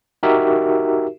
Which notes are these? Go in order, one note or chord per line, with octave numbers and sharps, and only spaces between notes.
D#4 F#4 G4 A#4 E5